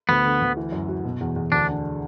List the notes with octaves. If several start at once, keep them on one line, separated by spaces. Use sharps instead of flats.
D2 B3
D3
D2
E3
F#2
F#4
B2
E2
E2
D2 D4
D4